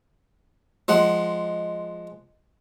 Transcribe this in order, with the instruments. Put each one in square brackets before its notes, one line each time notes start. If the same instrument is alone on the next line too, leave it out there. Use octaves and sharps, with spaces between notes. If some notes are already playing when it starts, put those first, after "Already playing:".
[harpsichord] F3 G#3 F#5